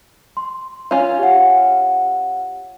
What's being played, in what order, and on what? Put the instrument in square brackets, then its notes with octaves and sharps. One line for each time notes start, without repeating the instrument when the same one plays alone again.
[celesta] C6
[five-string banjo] C#4 F4
[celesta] G4 F#5